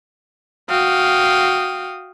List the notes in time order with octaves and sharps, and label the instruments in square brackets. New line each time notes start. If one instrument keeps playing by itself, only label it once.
[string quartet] F#4 F5 G5 D#6